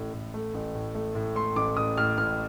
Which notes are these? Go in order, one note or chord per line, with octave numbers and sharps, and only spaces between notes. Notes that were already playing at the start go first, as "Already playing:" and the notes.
Already playing: A1 A2
A2
A3
A1
A2
A3
A2
A3 C6
A1 D6
A1 D#6
A2 F6
A1 F6